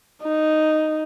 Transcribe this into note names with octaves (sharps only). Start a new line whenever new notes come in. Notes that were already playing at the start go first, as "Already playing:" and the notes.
D#4